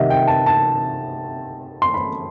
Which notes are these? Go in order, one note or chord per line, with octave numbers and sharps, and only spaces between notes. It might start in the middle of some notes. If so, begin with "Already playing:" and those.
Already playing: C3 D#3 G3 D#5 E5 F#5
G5
A5
A5
C6
B5